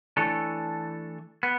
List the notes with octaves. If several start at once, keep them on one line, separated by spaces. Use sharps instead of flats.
E3 A3 D4 A4 C#5
B3